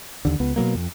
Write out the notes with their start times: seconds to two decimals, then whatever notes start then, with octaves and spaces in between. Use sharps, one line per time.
0.25 D#2 D3
0.40 C#2 B3
0.56 B2 D3 F#3 A#3
0.75 F2